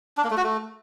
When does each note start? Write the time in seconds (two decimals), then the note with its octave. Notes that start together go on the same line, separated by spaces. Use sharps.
0.17 D4
0.24 A#3
0.31 A3
0.37 F#4
0.44 A3